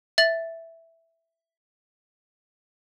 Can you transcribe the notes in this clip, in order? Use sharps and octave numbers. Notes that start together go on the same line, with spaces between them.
E5 A6 F#7